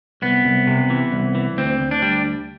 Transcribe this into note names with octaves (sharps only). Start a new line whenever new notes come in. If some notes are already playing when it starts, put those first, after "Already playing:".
C2 B3
C2
C3
E3
C2
E3
D2 C4
D2
D4
G3